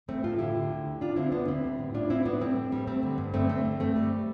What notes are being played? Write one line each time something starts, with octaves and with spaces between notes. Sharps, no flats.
E3 A3 C4
A2 F4 A4
D3 E4 G4
D3
D2
D2
D2 D4 F4
D3 C4 E4
D3 B3 D4
D2 C4 E4
G3
A2
A2 D4 F4
A2 C4 E4
G3 B3 D4
A2 A3 C4
A2
G3
G3 A3 C4
D3
G2
D3 A3 C4
D3 A3 C4
G2
G2 A3 C4
G3